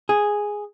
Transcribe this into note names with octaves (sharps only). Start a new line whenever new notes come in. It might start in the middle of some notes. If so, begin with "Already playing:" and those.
G#4